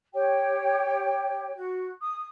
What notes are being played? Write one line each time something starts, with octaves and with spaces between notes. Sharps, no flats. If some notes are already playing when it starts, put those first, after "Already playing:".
G4 C#5 G5
F#4
D#6